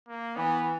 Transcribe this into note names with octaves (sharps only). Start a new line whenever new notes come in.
A#3
E3 B3